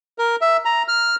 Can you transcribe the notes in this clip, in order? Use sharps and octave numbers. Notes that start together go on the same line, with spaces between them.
A#4
E5
A#5
F6